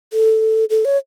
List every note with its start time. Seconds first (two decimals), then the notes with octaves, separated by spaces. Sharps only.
0.13 A4
0.70 A4
0.85 C#5